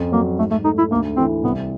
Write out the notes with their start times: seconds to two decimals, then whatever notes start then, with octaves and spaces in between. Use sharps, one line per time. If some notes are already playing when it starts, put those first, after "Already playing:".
Already playing: F2 C#4
0.12 F#3 A#3
0.38 G#2 A3
0.51 A3
0.65 A3 D#4
0.78 E4
0.91 D2 A#3
1.17 E3 C4
1.43 C2 B3